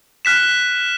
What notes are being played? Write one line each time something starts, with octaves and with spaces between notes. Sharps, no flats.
F6 F#6 B6 E7